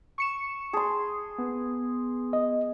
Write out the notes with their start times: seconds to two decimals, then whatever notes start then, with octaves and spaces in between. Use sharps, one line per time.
0.18 C#6 C#7 E7
0.73 G#4 A5 C6
1.38 B3
2.33 D#5